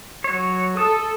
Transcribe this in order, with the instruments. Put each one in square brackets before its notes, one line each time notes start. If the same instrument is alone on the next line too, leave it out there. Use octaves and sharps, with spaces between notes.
[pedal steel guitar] F#3 C#5
[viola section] A4 [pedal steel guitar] A5 D#6